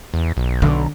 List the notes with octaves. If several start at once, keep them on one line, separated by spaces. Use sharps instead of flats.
E2
B1
D3